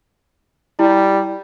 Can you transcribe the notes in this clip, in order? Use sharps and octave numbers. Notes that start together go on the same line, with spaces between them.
G3 E4